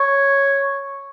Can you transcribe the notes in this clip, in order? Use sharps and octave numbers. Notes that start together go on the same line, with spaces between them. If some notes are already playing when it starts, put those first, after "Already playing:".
Already playing: C#5